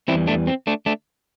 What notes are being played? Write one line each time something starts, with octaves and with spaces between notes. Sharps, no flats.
E2 E3 G3 C4 E4
A3 D4
C4
A3 D4
A3 D4